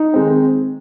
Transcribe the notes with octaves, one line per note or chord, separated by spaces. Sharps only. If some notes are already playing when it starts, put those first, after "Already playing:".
Already playing: D#4
D#3 G#3 C4